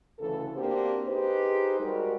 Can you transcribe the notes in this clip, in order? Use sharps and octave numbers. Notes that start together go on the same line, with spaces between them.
D2 C#3 E3 A4
A#3 C4 D4 F#4 G4 C5
D#4 G4 G#4 B4 C5
G3 G#3 F#4 G4 A#4